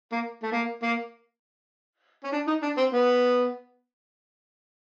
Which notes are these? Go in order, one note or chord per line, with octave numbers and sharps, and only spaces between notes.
A#3
A3
A#3
A#3
C#4
D4
D#4
D4
C4
B3